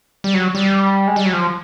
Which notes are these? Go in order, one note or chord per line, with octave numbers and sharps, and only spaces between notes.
G3
F#3
G3
G#3
G3
F#3
F3